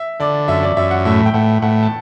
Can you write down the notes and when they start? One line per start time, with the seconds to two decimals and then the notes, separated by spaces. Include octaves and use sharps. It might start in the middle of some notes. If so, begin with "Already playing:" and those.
Already playing: E5
0.20 D3 D5
0.48 F#2 E5
0.63 D5
0.76 F#2 E5
0.91 F#5
1.05 A2 E5
1.26 G5
1.34 A2 F#5
1.62 A2 F#5
1.82 A5